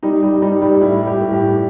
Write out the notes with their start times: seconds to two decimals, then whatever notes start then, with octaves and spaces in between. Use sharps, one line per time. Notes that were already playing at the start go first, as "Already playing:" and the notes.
0.03 G3 D#4
0.23 G3
0.42 G3 D#4
0.62 G3
0.81 A2 E4
1.01 G3
1.07 G4
1.20 A2
1.34 G4
1.40 A2